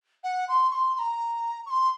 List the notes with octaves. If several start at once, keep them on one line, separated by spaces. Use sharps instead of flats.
F#5
C6
C#6
C6
C6
A#5
C#6
C6